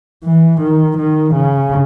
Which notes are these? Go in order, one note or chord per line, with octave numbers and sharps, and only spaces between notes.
E3
D#3
D#3
C#3